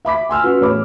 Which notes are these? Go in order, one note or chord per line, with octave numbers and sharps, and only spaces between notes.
E5 B5 D6 B6
G#5 C6 E6 F6
C#4 F#4 B4
E2 A2 C#5 B5 D6